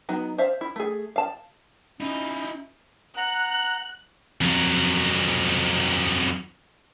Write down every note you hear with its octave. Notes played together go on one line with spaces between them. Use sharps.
F#3 B3 D#4
C5 E5 F5 A5
E4
A3 G#4
F5 A5
C#4 D#4 E4
F#5 A#5 F#6
F2 F#3